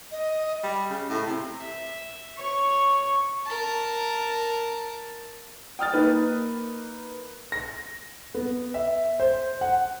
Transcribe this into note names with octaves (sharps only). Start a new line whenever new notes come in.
D#5
G3
C#3
A2
C3
E5
C#5 C#6
A#4 A5
G5 D#6 F6 A6
A#3 D#4 B4
A#6
B3
E5
C5
F#5